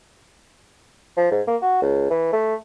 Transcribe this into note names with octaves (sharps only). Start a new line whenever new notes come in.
F3
G#2
A#3
F#4
C#2
E3
A3